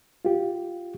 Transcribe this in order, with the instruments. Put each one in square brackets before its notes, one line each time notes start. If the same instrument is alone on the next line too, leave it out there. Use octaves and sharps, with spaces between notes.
[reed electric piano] F4 G4